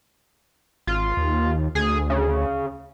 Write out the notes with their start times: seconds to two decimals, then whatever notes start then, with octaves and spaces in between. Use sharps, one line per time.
0.87 G#1 F4
1.17 D#2
1.75 D2 G#4
2.10 C#3